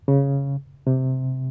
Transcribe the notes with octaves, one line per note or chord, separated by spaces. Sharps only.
C#3
C3